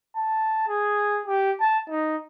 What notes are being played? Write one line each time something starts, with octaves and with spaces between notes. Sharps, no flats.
A5
G#4
G4
A5
D#4